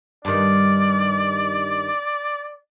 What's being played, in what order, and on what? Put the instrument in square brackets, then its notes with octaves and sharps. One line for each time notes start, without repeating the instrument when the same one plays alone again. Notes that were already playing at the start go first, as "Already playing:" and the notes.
[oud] G2 D#3 [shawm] D5